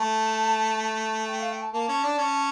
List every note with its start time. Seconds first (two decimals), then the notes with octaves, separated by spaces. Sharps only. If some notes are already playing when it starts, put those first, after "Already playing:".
Already playing: A3 A5
0.82 A5
1.27 G5
1.40 F5
1.51 G5
1.61 A5
1.73 A#3 A5
1.88 C#4
2.03 D4
2.18 C#4